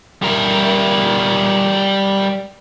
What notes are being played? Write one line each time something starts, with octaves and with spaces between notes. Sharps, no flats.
G3 A#4